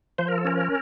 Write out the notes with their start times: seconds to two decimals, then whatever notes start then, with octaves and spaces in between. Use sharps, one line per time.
0.18 F3 C5
0.28 A#4
0.38 A4
0.45 C#4 A#4